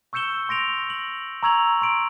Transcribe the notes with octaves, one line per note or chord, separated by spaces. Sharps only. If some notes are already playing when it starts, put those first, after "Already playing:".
C#6 E6 G6 C#7 E7 G7
C6 A#6 D7 F7
F#7
A#5 C#6 E6 G#6 F7 F#7
C6 D7 F#7